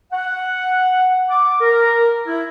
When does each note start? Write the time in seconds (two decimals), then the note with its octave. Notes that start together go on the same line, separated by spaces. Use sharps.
0.12 F#5
1.30 D6
1.60 A#4
2.26 E4